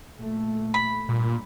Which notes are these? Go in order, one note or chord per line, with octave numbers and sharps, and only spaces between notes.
A#2 A3
B5
G2 A#2